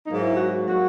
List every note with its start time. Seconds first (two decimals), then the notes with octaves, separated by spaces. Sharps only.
0.07 G#2 F#3 A#3 D#4
0.22 E4
0.36 F#4
0.66 F#3 A#3 F#4